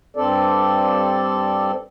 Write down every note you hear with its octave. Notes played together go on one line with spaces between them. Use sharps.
G2 C4 A4 D5